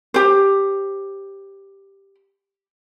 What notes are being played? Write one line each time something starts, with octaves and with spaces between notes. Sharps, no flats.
G4 C5